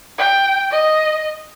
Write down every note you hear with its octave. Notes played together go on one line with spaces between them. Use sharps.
G5
D#5